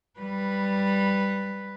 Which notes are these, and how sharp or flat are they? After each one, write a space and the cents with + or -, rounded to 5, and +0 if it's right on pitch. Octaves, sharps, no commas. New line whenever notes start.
G3 +0 B4 +0